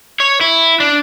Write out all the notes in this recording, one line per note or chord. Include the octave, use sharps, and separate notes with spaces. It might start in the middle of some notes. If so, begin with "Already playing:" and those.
C#5
E4
D4